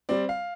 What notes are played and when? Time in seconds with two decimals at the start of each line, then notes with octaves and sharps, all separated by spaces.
0.09 G3 C4 D5
0.29 F5